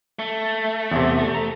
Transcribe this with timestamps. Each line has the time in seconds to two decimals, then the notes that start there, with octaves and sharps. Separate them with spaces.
0.19 A3
0.91 E2 C3
1.34 A#5